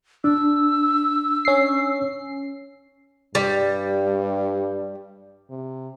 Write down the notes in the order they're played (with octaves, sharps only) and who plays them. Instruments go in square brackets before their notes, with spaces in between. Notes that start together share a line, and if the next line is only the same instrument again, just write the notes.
[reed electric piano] D4 [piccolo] E6
[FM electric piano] C#4 C7
[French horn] G2 [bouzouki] G3
[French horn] C3